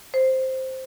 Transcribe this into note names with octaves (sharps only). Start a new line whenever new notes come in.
C5